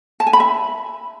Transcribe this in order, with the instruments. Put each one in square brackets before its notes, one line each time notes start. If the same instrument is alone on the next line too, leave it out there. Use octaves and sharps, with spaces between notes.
[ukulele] A5
G#5
B5
E5